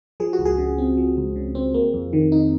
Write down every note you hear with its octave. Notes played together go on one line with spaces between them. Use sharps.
F3 G#4
F#4
C#2
G#4
C#3
C4
F3
C#2
C#3
C4
A#3
F2
D#3
D#4